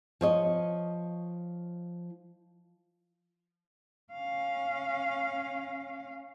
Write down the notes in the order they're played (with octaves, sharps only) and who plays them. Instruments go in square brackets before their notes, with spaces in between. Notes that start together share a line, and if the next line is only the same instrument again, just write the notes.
[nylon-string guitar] F3 C#5 D#5
[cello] C#4 F5